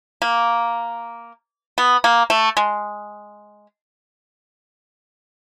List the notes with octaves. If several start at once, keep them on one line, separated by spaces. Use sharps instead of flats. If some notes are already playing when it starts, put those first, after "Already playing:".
A#3
B3
A#3
A3
G#3